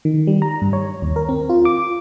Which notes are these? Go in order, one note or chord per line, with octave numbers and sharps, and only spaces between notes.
D#3
G3
A#5
G2
C#5
D#2
A#4
C4
F4
D6